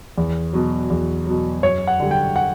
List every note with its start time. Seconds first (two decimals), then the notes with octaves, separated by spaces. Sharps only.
0.18 E2
0.53 B2 F#3
0.90 E2
1.26 B2 F#3
1.63 F#2 C#5
1.87 F#5
2.00 D3 G3
2.11 G5
2.36 F#5